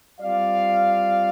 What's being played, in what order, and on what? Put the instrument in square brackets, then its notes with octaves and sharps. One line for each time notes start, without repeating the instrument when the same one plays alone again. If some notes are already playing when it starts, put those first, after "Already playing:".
[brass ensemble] G3 C4 F4 D5 F5